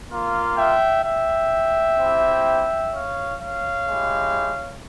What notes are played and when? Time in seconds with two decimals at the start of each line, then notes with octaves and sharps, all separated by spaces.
0.10 A#3 F4
0.57 E5 G5
1.04 E5 G5
1.98 C4 E4 G4
2.93 C#5 F5
3.39 C#5 F5
3.87 G#3 E4 G4